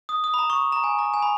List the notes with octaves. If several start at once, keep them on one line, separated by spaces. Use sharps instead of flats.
D#6
D#6
B5
A#5
C#6
A#5
G#5
A#5
G#5
B5